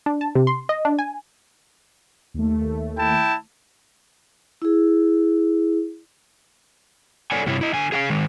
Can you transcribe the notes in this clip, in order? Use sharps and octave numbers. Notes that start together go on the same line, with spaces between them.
D4
A5
C3
C6
D#5
D4
G#5
D#2 A3
E4 G5 A5
E4 G#4
A4 C#5 D5 F#5 G#5
G2 C3 E4 C#5
E4 D#5
D3 G#5
G#4 F5 F#5 G#5
D#3 G#3